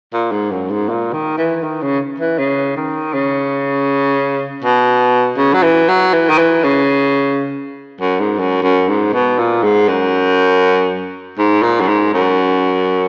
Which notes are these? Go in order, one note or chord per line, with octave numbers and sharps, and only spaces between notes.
A#2
G#2
F#2
G#2
A#2
D#3
E3
D#3
C#3
E3
C#3
D#3
C#3
B2
C#3
F#3
E3
F#3
E3
D#3
E3
C#3
F#2
G#2
F#2
F#2
G#2
B2
A#2
G#2
F#2
G#2
A#2
F#2
G#2
F#2